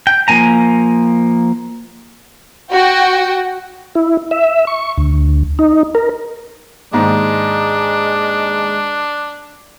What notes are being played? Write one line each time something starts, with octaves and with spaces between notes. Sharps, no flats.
G5
F3 A#3 G#5 A#5
F#4 G5
E4
E5
C#6
D2
D#4
A#4
D#2 G#2 G#3 D4